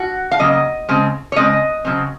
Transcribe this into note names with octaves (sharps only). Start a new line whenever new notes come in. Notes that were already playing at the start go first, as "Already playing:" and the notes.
Already playing: F#4
F5
C#3 F#3 A#3 D#5
C#3 G#3 C4
C#5
C#3 G#3 C4 D#5
C#3 F#3 C4